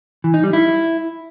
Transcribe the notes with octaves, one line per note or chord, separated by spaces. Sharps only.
E3
D#4
G3
E4